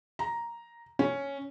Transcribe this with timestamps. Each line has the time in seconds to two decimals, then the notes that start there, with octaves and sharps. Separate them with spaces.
0.19 A#5
0.99 C#4